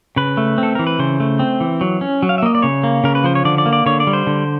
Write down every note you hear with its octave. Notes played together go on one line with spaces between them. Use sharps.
C#3 B4
A3
C4
A4
E3 A#4
B4
C#3 C5
A3
C4
E3
F#3
C#4
F#3
F5
E5
A#3 D#5
D5
C#3 C#5
A#3
C#3 A#4
B4
F3 C5
C#5
D3 D5
D5
A#3
D5
D3 C#5
D5
G3
C5
D3